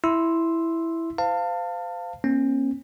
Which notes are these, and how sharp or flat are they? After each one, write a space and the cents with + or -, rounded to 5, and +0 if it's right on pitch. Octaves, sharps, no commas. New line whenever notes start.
E4 +0 C6 +0 E6 +0
C5 -40 F5 +0 A5 +30
A#3 +25 C#4 -35